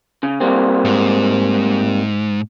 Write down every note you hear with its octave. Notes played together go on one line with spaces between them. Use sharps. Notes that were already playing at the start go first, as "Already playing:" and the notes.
C#3
G3 A#3 C4
G#2